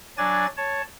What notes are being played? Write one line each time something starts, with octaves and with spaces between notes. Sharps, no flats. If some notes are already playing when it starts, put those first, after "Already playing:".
F#3 D4 D5 G#5 A6
C#5 A5